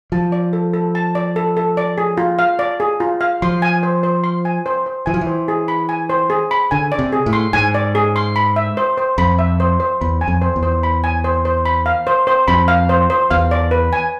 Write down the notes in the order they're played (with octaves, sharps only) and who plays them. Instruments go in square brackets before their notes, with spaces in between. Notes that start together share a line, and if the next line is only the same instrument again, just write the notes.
[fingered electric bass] F3 [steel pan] A5
[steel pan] D5
A4
A4
A5
D5
A4
A4
D5
G#4
F4
F5
D5
G#4
F4
F5
[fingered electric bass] F3 [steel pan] C6
[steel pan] G#5
C5
C5
C6
G#5
C5
C5
[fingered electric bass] E3 [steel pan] G#5
[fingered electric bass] F3
E3
[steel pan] C5
G#4
B5
G#5
C5
G#4
B5
[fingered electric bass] D3 [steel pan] G#5
[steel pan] D5
[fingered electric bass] C3
[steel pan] G#4
[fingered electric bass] A2
[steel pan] C6
[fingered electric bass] G#2 [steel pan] G#5
[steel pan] D5
G#4
C6
B5
E5
C5
C5
[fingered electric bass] F2 [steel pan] B5
[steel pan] E5
C5
C5
[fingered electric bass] E2 [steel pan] B5
[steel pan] G#5
[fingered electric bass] F2
[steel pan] C5
[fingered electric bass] E2
[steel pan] C5
B5
G#5
C5
C5
B5
F5
C5
C5
[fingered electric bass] F2 [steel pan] B5
[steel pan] F5
C5
C5
[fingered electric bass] E2 [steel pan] F5
[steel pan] D5
B4
G#5